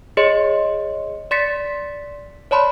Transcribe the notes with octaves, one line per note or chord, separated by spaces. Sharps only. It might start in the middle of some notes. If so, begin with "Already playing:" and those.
G#4 C#5 D#5 C6
D5 C6 A6 B6 C#7
C#5 D5 A5 B5 C6